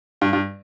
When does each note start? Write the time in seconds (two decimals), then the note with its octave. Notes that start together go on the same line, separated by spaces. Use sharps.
0.21 G2
0.33 G2